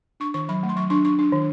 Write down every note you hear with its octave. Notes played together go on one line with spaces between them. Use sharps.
D4 C#6
D#3 C#6
F#3 B5
A3
C6
F#3 C#6
D4 C#6
D4 C#6
D4
D#3